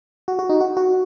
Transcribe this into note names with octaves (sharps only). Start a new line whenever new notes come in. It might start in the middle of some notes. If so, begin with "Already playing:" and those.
F#4
F#4
D#4
F#4
F#4